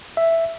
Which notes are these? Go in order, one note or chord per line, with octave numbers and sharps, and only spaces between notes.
E5